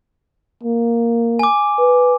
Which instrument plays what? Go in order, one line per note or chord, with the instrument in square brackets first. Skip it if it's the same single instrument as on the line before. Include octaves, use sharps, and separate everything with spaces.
[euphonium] A#3
[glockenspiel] G#5 D6
[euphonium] B4